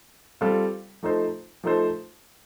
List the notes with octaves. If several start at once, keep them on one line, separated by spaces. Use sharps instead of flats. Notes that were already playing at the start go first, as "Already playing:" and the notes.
G3 C4 F4 A4
F3 A3 D#4 A4 C5
F3 A3 D#4 A4 C5